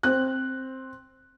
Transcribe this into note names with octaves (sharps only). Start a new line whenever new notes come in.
C4 F#6